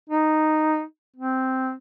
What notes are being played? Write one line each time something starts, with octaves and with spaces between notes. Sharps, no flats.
D#4
C4